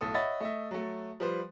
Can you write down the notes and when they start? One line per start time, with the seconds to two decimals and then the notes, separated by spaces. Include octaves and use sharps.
0.01 B1 A2 A4 D#6
0.14 C#5 D#5 E5 F#5 B5 A6
0.40 A3 D#5 E5
0.71 F#3 A3
1.20 F3 G3 B4 C5